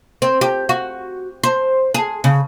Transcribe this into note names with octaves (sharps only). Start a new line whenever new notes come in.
C4
G4
F#4
C5
G#4
C#3